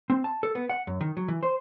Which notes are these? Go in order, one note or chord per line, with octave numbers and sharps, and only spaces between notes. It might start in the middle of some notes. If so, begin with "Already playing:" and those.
C4
A5
A4
B3
F#5
F#2
D#3
F#3
E3
C5